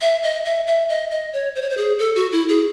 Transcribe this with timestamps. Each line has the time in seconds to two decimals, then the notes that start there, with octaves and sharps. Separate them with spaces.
0.01 E5
0.23 D#5
0.45 E5
0.67 E5
0.89 D#5
1.11 D#5
1.33 C#5
1.55 C5
1.62 C#5
1.70 C5
1.78 G#4
1.99 A4
2.16 F#4
2.32 E4
2.49 G#4